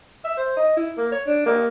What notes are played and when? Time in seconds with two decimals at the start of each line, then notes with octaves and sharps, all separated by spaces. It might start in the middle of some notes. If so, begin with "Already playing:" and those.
0.25 E5
0.37 C5
0.56 D#5
0.76 E4
0.97 A#3
1.12 C#5
1.26 D4
1.46 A#3